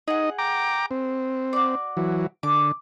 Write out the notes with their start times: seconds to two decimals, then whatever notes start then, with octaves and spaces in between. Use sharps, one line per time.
0.08 D#4 G#4 D#5 F#5
0.38 G5 A#5 D6
0.91 C4
1.53 F#4 D5
1.97 E3 F#3
2.43 D3 D6